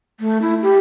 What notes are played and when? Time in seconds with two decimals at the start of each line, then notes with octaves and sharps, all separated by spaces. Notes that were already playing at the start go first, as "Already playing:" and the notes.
0.20 A3
0.42 E4
0.62 G4